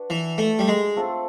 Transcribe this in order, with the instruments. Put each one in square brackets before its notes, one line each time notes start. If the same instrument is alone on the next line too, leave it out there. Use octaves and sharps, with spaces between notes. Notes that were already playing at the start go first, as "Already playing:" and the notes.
Already playing: [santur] D4 F#4 B4
[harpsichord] E3
A3
G3
G#3
[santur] A3 C4 F4 A4